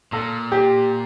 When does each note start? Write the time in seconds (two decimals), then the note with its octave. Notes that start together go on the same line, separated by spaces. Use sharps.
0.12 A#2 A4
0.52 G4